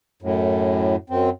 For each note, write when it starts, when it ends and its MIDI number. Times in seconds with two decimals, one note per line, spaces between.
0.22 0.96 42
0.22 0.96 45
1.10 1.30 42
1.10 1.30 60